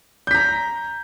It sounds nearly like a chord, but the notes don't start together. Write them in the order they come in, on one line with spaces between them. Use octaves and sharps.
G6 B6 A#5